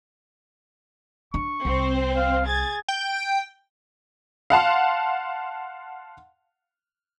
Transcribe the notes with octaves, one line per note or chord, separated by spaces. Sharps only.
D4 C#6
C2 C4 C5
F5
G#4 G#6 A6
G5
F5 F#5 A5 C6